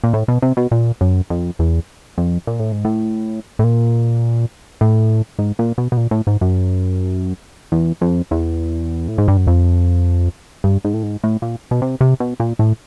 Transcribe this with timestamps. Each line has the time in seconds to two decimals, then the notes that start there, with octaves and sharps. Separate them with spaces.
0.04 A#2
0.13 A2
0.28 B2
0.42 C3
0.57 B2
0.71 A#2
1.01 F#2
1.30 F2
1.59 E2
2.18 F2
2.47 A#2
2.59 A2
2.72 G#2
2.85 A2
3.59 A2
3.64 A#2
4.81 A2
5.39 G#2
5.59 A#2
5.78 B2
5.92 B2
5.97 A#2
6.11 A2
6.27 G#2
6.41 F#2
7.72 E2
8.01 F2
8.31 E2
9.08 A2
9.18 G#2
9.28 G2
9.37 F#2
9.47 F2
10.64 G2
10.84 G#2
10.94 A2
11.03 G#2
11.23 A2
11.42 A#2
11.71 B2
11.82 C3
12.01 C3
12.20 B2
12.40 A#2
12.59 A2